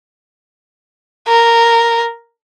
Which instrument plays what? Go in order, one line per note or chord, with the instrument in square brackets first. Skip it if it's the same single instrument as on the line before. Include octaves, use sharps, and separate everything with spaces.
[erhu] A#4